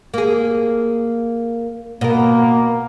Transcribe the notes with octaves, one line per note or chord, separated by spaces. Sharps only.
A#3 G#4
B2 A#3 A#4